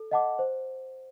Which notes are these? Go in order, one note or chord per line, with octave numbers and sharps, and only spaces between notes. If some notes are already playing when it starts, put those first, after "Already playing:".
Already playing: A4
D#5 F#5 A5 D6
C5